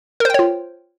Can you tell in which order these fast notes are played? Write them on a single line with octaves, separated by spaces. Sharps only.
A#4 C5 G5 C#5 F4